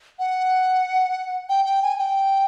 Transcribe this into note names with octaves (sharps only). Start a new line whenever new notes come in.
F#5
G5
G5
G#5
G5